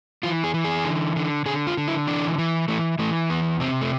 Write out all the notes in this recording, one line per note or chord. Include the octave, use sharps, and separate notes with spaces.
E3 F4
G#4
E3
G#4
D3
D3
D3 G#4
F4
D3
E4
E3 D4
E3
E3 A3
E3 A3
E2 B3
C3 C4
A3